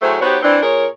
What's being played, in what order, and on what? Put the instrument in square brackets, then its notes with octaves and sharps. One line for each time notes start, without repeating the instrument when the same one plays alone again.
[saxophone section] A2 F#3 A3 G#4 C5
B3 D#4 F#4 G4 C5 C#5
E3 C4 D4
A#2 G#4 A#4 C#5